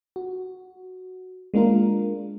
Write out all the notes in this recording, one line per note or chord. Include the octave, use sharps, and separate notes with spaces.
F#4
G#3 A#3 D4 F4 A#4